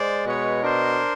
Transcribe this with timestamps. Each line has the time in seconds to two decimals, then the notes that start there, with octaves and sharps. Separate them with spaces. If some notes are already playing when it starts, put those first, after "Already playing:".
Already playing: G#3 C5 D5
0.25 B2 B4 C#5
0.63 D4 A#4 C5